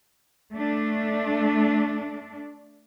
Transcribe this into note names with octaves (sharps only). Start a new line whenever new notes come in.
A3 D4